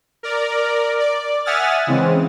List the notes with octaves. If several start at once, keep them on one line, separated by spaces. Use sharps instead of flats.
A#4 D5
D5
E5 F#5 G#5 D#6 F6 A6
C#3 E3 G#3 C4